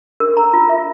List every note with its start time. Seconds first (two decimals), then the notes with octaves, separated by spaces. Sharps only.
0.20 A#4
0.37 A#5
0.53 F4
0.69 E5